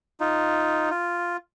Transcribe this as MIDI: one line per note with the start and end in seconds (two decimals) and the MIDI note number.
0.20 0.90 63
0.20 0.90 65
0.90 1.37 65